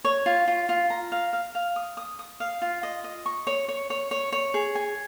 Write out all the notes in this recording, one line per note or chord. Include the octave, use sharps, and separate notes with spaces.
C#5
F4
F4
F4
A#5
F5
F5
F5
D#6
D#6
D#6
F5
F4
D#5
D#5
C#6
C#5
C#5
C#5
C#5
C#5
G#4
G#5